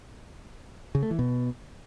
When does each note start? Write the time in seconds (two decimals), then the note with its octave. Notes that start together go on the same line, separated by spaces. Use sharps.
0.95 C#3
1.03 A3
1.11 E3
1.19 B2